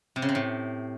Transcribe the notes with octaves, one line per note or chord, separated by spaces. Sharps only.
C3
C#3
C3
A2